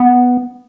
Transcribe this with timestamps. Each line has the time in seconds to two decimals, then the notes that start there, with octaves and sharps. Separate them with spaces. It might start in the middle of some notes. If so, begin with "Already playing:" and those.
Already playing: B3